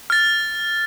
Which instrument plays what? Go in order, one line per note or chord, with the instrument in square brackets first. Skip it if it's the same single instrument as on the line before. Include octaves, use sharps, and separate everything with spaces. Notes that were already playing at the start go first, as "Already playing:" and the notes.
[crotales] F6 A6